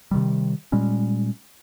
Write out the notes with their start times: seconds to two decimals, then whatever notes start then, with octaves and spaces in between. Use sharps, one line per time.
0.11 C3 D#3 G3
0.72 A#2 G3 G#3 C#4